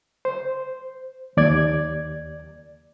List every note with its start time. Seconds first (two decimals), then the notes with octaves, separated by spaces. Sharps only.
0.25 C5
1.37 D#2 D5 G#6